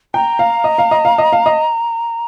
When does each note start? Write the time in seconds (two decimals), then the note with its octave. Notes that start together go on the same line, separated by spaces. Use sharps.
0.14 G5 A#5
0.39 F5
0.64 D#5
0.78 F5
0.91 D#5
1.05 F5
1.18 D#5
1.33 F5
1.46 D#5